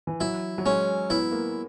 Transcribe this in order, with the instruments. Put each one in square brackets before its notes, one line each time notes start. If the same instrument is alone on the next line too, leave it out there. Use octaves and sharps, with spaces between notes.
[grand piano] E3
[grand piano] F#3 [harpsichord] E4
[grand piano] F#3
[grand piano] G#3 [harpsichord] C#4
[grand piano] B3 [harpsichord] E4
[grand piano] A#3